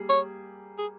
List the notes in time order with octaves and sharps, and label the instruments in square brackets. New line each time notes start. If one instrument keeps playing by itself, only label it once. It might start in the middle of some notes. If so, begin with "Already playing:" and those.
Already playing: [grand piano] G3 A#3 G#4
[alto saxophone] C#5
G#4